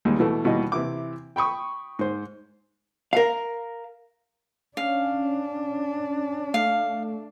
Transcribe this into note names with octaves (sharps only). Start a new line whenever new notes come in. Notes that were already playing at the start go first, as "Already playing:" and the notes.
D#2 G3 G#3
B2 E3 A3
D#2 B2 E3 G3 D#5
C3 E3 E4 D6
G5 B5 C#6 D#6
G#2 C5
A#4 F5
C#4 D4 F5
A3 F5